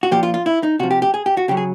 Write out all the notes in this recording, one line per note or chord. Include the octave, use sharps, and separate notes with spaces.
F#4
A#2 F3 G4
F4
F4
E4
D#4
C3 F3 F#4
G4
G4
G#4
G4
F#4
C#3 F#3 G4
G#4